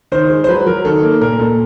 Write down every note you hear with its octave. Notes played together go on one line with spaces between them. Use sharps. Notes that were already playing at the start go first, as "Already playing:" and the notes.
D#3 C5
G#3
C5
F#3 B4
F#3 A#4
D#3 A4
A#3
A#2 A#4
A#2 A4